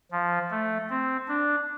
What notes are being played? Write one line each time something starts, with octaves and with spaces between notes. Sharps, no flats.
F3
A3
C4
D4